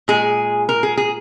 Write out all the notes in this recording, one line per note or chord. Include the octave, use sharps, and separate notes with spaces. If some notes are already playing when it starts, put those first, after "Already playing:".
A#2 G#3 G#4
A#4
G#4
G#4